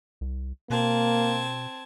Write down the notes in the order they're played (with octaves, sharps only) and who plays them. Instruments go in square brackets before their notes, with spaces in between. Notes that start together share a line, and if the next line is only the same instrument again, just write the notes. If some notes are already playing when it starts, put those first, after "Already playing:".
[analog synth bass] C2
[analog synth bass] B2 [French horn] A#3 [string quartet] C4 A5 G#6